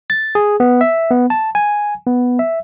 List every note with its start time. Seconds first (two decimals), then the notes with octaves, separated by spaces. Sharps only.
0.10 A6
0.35 G#4
0.60 B3
0.81 E5
1.11 B3
1.30 A5
1.55 G#5
2.06 B3
2.39 E5